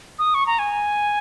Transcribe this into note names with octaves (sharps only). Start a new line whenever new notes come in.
D#6
C#6
A#5
G#5